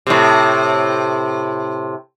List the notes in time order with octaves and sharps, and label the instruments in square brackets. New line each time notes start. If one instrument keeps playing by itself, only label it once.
[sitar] A2 C3